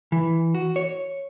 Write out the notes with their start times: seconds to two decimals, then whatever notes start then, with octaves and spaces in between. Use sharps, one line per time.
0.12 E3
0.55 F#4
0.76 C#5